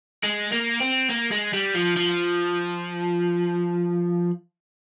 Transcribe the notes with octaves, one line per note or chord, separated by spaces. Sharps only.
G#3
A#3
C4
A#3
G#3
G3
F3
F3